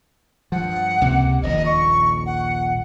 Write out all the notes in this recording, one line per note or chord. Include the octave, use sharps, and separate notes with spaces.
G2 F3 F#5
C#2 C3 A#3
D#1 A#1 D#5
C#6
F#5